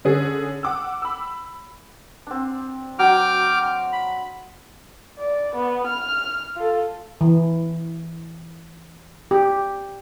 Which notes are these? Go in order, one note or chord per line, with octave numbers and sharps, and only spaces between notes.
D3 C#4 G#4
F#5 D6 E6
B5 E6
C4 D4
F#3 D4 G5 D6 F6
B5
D5
B3
F6
F4 A4
E3
G4